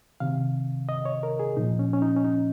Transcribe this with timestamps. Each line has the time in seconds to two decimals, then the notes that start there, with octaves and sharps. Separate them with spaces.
0.20 C3 D#3 F5
0.89 D#5
1.05 C#5
1.23 A#4
1.40 G#4
1.57 A#2 F3 D#4
1.79 C#4
1.93 C#4
2.02 D#4
2.16 C#4
2.24 D#4